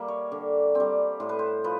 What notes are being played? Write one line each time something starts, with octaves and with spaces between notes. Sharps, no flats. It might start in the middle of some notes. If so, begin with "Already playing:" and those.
Already playing: G3 A#3 E5
C#5
D3
G3 C4
A2 C5
B4
C5
F3 B4